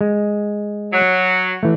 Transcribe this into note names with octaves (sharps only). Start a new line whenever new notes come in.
G#3
F#3
E3 A3